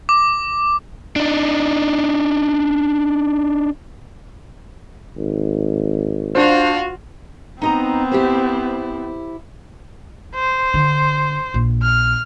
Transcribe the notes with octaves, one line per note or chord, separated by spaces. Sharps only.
D6
D4 D#4
G#1
D4 F4 F#4 C5 F5
B3 C4 D#4 D#5 A#5
E4 G4 C5
C5
D3
A#1
F6